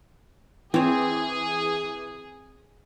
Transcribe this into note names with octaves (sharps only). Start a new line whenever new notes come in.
E3 C4 G#4 C#5